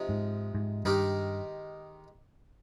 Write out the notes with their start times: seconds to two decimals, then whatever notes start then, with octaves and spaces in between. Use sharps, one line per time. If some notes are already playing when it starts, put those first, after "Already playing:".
Already playing: C3 F3 G#3 D#4
0.09 G#2
0.55 G#2
0.85 G2 D#3 G#3 D#4 G4 A#4